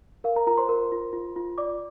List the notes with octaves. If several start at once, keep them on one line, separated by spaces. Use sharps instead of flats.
A#4 F5
A#4 A#5
F4 A#4 A#5
C5 C6
A#4
F4
F4
F4
D5 D6